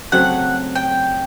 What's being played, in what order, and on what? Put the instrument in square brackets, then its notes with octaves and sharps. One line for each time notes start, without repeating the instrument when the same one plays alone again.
[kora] C#3 F#3 A3 C4 [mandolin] F#5
[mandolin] G5